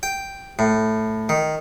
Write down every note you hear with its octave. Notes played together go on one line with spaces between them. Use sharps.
G5
A2
D#3